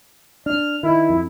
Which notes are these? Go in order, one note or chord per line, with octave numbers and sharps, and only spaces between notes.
D4 F6
D#3 E4
F2